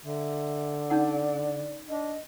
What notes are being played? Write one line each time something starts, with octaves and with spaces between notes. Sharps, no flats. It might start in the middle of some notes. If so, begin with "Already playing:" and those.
D3 E5
C#4 D#4 D5 F#5
D4 D#5